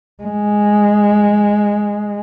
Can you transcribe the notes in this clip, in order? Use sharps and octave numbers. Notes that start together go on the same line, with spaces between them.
G#3